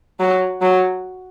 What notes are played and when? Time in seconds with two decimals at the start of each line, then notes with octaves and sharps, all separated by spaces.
0.20 F#3
0.62 F#3